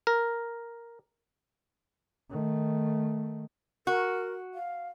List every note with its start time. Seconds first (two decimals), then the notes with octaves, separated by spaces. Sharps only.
0.07 A#4
2.30 D#3 A3
3.87 F#4 A#4
4.54 F5